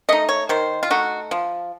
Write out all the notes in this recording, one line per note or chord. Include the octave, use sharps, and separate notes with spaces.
A3 D#4 D#5
C#5
D#3 C5
F4
A3 D#4 F#4
F3